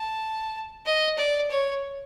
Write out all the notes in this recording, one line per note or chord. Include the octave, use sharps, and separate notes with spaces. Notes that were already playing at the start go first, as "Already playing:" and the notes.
Already playing: A5
D#5
D5
C#5